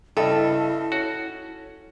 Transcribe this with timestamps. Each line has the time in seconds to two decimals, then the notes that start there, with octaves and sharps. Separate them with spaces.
0.17 G2 C#3 E4 A4 D#5 E5
0.92 C#4 F#4